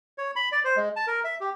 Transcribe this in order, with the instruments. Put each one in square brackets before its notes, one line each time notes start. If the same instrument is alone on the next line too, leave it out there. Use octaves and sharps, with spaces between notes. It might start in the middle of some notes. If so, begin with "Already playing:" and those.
[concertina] C#5
B5
D5
C5
G#3
A5
A#4
E5
G4